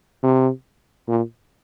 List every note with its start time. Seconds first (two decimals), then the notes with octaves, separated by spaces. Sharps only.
0.23 C3
1.08 A#2